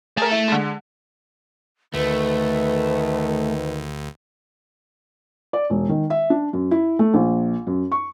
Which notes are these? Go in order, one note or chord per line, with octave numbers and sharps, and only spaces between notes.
A3 G#4 A#4 A5
E4
D3 G#3
D2 D#3 A3 B4
D5
E1
D#3
E5
D4
F#2
E4
A3
A#1
F#2
C#6